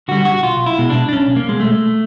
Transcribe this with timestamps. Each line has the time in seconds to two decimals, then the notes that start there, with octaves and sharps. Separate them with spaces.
0.08 D3 G3 F#4
0.25 F#4
0.43 B1 F4
0.66 E4
0.78 B2 G#3
0.90 D4
1.09 D4
1.13 B1 C#4
1.36 A#3
1.48 B2 G#3
1.60 A3